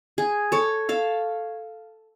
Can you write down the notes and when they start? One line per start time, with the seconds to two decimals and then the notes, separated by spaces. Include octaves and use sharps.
0.18 G#4
0.52 A4 C#5
0.89 A4 F5